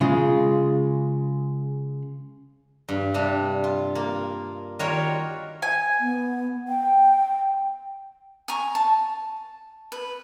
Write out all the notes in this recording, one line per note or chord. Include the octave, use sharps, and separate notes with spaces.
C#3 G#3 F4
G2
C3 G3 D4
F4
A#3
D#3 G3 F4 F#4 A#4 C#5
G#5
B3
G5
G#5 A#5 C#6
A5
B4